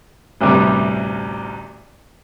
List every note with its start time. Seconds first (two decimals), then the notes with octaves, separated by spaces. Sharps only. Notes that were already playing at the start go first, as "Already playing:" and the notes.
0.41 A1 D2 G2 C3 G3